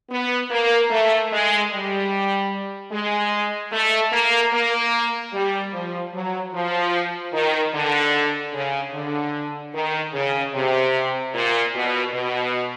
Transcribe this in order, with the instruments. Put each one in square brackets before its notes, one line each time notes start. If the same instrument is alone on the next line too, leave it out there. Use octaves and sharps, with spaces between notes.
[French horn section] B3
A#3
A3
G#3
G3
G#3
A3
A#3
A#3
G3
F3
F#3
F3
D#3
D3
C#3
D3
D#3
C#3
C3
A#2
B2
B2